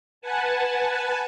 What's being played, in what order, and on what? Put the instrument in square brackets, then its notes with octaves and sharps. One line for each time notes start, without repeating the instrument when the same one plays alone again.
[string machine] B4 F#5 G#5 A5